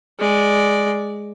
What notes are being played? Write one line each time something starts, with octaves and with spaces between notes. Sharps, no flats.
G#3 D5